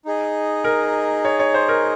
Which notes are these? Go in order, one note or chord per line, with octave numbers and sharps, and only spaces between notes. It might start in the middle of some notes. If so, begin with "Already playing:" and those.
D#4 G#4 D#5
A#4
C#5
C#5
C5
A#4